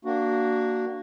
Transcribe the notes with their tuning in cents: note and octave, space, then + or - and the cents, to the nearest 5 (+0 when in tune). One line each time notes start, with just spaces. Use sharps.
A#3 -10 D4 +0 F#4 +10